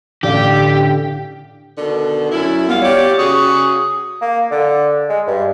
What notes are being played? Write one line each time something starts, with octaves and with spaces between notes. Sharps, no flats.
A1 D3 G4 D5 F5
B2 D3 D#3
F#2 E4
G3 B3 F4 F5
G4 C#5 D5
C#3 F#4 G#4 D#6
A#3
D3
G#3
G2